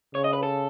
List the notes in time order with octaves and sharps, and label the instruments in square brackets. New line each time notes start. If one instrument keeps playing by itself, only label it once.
[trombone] C#3 [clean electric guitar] C#5
[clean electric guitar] D#5
B4
A4